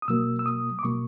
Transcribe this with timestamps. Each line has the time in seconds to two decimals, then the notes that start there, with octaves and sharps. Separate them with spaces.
0.02 D#6
0.08 B2 F#3 A#3 E6
0.39 E6
0.46 D#6
0.79 D6
0.83 B2 F#3 A#3 C#6